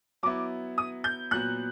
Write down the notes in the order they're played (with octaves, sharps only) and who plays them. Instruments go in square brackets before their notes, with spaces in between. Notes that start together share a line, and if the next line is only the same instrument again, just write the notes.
[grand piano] F#3 B3 E4 [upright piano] D6
[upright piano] D#6
G6
[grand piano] A#2 F#3 B3 [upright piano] F#6